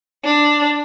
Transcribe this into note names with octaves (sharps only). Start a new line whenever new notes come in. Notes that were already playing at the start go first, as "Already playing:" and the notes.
D4